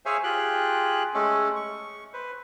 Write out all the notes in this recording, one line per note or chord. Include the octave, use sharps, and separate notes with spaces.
G#4 C5 C#5 E5 F5 G#5
F4 G4 G#4 G5 F#6
G#3 A3 C#4 A4
C#6
B4 C5